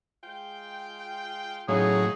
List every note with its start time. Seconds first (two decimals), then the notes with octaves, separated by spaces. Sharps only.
0.22 G#3 F4 G5
1.68 A2 C#3 F#3 D#4 G#4